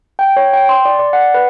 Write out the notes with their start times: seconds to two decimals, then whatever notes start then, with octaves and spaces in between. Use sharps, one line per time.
0.19 G5
0.37 C#5
0.53 G5
0.69 C6
0.85 D5
0.99 D5
1.13 F#5
1.34 B4